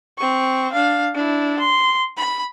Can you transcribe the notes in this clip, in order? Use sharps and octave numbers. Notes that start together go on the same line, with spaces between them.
C4 C#6
D4 F5
D4 E4
C6
B5